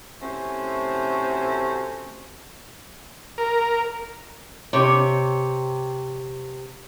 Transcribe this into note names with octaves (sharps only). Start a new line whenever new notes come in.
C3 A3 C#4 E4 F#4 C5
A#4
C3 C#5